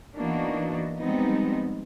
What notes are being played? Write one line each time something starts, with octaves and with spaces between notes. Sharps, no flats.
E3 A#3 B3 D4 D#4 F#4
F3 G3 G#3 B3 C4 D#4